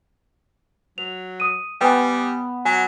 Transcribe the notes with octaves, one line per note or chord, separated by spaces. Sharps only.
F#3 F7
D#6 D#7
G3 B3 G5 G#5
F#3 G#5